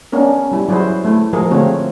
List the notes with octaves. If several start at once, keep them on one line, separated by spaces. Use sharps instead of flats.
B3 C#4 D4 A#4
G3 E4
F#3 E4 F#4 G#4 C5
A3 E4
F3 G#3 G#4 A#4
D3 A3 C4 F4 F#4 C#5